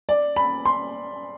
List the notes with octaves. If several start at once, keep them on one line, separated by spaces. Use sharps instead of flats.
D5
B5
C6